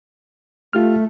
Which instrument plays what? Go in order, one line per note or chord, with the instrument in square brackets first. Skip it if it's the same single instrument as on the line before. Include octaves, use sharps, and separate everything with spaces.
[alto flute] A3 [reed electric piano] F4 G4 F6